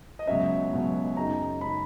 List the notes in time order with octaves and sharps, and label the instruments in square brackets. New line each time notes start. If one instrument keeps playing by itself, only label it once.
[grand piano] D#5
C#2 B2 F#3 C#4 E5
C#2 B2 F#3 C#4
F#2 C#3 G#3 D#4 A#5
C#3 G#3 D#4 B5